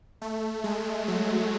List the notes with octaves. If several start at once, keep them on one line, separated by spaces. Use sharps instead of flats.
A3
G#3
F#3